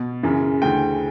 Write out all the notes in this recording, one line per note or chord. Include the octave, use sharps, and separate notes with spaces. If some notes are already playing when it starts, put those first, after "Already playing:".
Already playing: B2
F#2 C#3 E3
D2 C#3 E3 G5